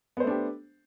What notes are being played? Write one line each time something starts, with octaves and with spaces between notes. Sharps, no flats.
A3 B3 D4 G4 C5